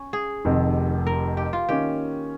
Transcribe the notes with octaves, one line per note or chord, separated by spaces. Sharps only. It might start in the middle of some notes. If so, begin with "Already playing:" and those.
Already playing: C#4
G#4
F1 F2 C3 D#3
A#4
G4
F4
D#3 A#3 C#4 G4